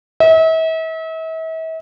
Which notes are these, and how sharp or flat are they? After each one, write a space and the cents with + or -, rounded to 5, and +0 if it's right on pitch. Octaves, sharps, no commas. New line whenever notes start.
E5 -40